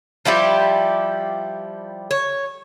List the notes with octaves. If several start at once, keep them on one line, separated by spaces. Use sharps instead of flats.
F3 G3 E4 G4
C#5